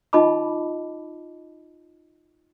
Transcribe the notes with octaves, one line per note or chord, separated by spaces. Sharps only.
D#4 F4 D#5 A5 B5 D6